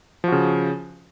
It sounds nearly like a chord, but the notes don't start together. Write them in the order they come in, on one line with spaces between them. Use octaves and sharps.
F3 F#4 C#3